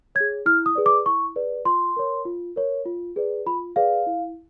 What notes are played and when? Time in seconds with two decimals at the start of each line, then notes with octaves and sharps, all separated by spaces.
0.15 C#5 G#6
0.20 G#4
0.46 E4 F6
0.66 D#6
0.75 G#4 B4 D5
0.86 D6
1.06 E4 C#6
1.36 G#4 B4 D5
1.65 F4 C6
1.96 A#4 C#5
2.25 F4
2.56 A#4 C#5
2.86 F4
3.16 G#4 B4 D5
3.46 F4 B5
3.76 G#4 B4 D5 F5
4.07 E4